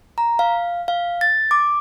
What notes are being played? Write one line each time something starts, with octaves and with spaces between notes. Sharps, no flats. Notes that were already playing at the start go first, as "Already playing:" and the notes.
A#5
F5
F5
A6
D6